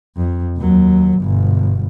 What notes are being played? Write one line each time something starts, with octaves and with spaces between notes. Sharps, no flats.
F2
D#2 F#3
G1 B2